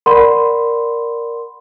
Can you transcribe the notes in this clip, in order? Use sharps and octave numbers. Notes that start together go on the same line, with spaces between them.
A#4 D5 F#5 B5 C6